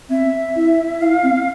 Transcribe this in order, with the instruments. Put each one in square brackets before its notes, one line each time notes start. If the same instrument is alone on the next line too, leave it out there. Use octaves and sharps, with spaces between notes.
[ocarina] C4 [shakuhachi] E5
[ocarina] E4
[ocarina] E4 [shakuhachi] F5
[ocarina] C4